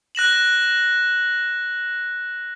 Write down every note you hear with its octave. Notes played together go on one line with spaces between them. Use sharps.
F#6 A#6 E7 F#7